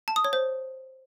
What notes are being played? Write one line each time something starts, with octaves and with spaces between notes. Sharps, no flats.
A5
D#6
C#5
C5